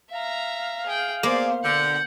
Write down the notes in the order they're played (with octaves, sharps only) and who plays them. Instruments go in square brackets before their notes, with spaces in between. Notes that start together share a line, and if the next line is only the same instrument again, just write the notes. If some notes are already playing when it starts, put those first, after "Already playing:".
[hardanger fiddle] E5 A#5 [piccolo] F5
[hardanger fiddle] G#4 G5
[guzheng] A#3 [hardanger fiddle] B3 C5 [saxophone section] G#4 D5
[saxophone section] B2 D3 [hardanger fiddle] F#5 [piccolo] G6